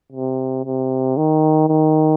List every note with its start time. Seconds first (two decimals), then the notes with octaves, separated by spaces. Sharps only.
0.12 C3
0.65 C3
1.17 D#3
1.69 D#3